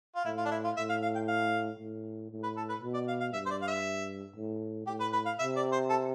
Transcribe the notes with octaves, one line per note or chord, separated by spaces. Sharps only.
F4
A2 E4
F4
D4
E4
F4
A2 E5
F5
F5
G5
F5
A2
A2
B4
A4
B4
B2
D5
F5
F5
G2 E5
C5
D5
F5
E5
A2
A2 G4
B4
B4
F5
C3 E5
D5
C5
A4